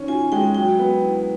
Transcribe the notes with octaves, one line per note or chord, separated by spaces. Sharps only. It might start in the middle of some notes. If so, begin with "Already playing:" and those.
Already playing: D#3 C#4
F4 G#5
G#3 G5
F#3 G5
B3
E4